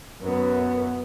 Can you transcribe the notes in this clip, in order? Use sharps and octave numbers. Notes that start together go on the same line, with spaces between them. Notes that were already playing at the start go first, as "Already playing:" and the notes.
F#2 B3